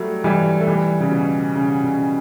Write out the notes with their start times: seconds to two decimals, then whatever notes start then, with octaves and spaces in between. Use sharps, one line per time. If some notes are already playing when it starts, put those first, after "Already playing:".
Already playing: F#3 G3 A3
0.24 E3 G3
0.60 A3
0.67 E3 G3
1.00 C#3
1.12 B2
1.55 C#3
1.84 C#3